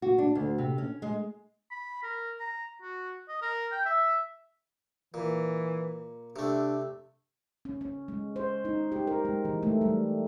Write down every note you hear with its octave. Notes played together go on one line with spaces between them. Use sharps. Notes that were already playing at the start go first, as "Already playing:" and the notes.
F#4
D4
D2
C3
C#4
G#3
B5
A#4
A#5
F#4
D#5
A#4
G5
E5
A#2 E3
C3 A3 D4
C#4
C#4
G#3
C5
D#4
G4
A#4
G#3
E3
A3
G3